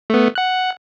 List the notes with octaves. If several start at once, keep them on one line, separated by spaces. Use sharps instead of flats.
A3 B3
F#5 F#6